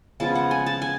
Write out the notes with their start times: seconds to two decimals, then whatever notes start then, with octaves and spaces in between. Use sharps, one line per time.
0.20 C#3 F3 G#3 B3 A5
0.35 F#5
0.51 G#5
0.66 A5
0.82 G#5